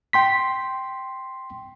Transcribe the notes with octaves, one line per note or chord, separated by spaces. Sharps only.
G5 C6 B6